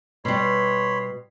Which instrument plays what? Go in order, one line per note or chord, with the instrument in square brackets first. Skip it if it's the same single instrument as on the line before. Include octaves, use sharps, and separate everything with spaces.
[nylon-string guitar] B2 G3 [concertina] C#5 B5 C6